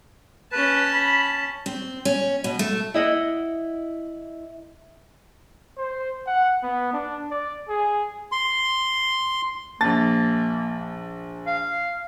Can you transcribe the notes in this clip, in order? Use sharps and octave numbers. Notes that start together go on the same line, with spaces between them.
C#4 B4 A5
B5
C4
C#4
B2
A3
E4 D#5 F5 F#5
C5
F#5
B3
D4
D5
G#4
C6
A#1 A#3 A5 A6
F5